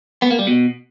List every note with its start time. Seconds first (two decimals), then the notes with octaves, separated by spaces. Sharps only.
0.22 B3
0.30 A#3
0.39 G3
0.47 B2